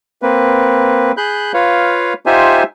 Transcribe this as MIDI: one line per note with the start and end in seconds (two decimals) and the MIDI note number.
0.22 1.12 58
0.22 1.12 60
0.22 1.12 71
1.17 1.52 68
1.17 1.52 83
1.17 1.52 90
1.17 1.52 91
1.54 2.13 65
1.54 2.13 71
1.54 2.13 73
1.54 2.13 77
2.26 2.63 63
2.26 2.63 65
2.26 2.63 67
2.26 2.63 72
2.26 2.63 76
2.26 2.63 80